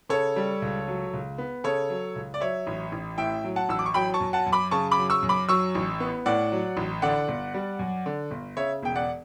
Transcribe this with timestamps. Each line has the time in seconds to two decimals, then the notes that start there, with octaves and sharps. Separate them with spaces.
0.09 C#3 A4 C#5
0.36 G3
0.62 C#2
0.87 F#3
1.13 C#2
1.38 B3
1.64 C#3 A4 C#5
1.90 F#3
2.16 C#2
2.34 D5
2.41 F#3 C#5 E5
2.67 A1
2.92 A1
3.18 A2 E5 G5
3.44 F#3
3.56 F#5 A5
3.69 A1 E6
3.79 D6
3.86 C#6
3.94 F#3 G5 B5
4.14 A5 C#6
4.20 F#2
4.33 F#5 A5
4.46 F#2
4.52 B5 D6
4.71 C#3 A5 C#6
4.91 B5 D6
4.98 F#3
5.10 C#6 E6
5.23 F#2
5.29 B5 D6
5.48 F#3 C#6 E6
5.75 A1
6.00 B3
6.26 A2 D5 F#5
6.52 F#3
6.77 A1
7.02 D3 D5 F#5
7.28 G1
7.54 G3
7.79 F#2
8.06 D3
8.31 G1
8.57 C#3 C#5 E5
8.83 E1 G5
8.96 D5 F#5